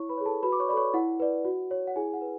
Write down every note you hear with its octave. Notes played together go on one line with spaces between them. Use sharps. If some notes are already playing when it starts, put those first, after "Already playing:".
Already playing: E4 C#5 C#6
B4 B5
G#4 C#5
A4 A5
F#4 B4 B5
D6
C#5 C#6
A4 C#5 D5 B5 C#6
E4 F#5
B4 D5
F#4
C#5
F#5
E4 G#4 G#5
F#5
B4